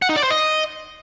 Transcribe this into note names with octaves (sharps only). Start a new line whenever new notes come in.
F#5
D#4
D5
C5
D#5